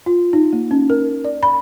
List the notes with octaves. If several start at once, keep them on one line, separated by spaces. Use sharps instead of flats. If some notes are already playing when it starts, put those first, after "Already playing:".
F4
D#4
A#3
C#4
A#4
D5
B5